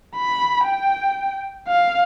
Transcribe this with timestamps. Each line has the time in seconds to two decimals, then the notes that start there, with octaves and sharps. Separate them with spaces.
0.16 B5
0.65 G5
1.68 F5